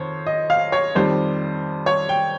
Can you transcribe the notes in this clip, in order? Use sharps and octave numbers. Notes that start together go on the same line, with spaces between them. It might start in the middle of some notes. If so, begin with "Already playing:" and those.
Already playing: F2 D#3 C5 C#5
D#5
F5
C#5
F2 D#3 G3 C5
C#5
G5